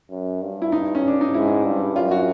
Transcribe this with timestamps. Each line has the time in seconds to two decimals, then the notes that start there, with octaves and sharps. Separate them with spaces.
0.10 F#2
0.41 G2
0.62 E4
0.72 D#4
0.95 C#4
1.08 D4
1.21 D#4
1.34 G#2 E4
1.65 G2
1.95 F#2 F4
2.11 F#4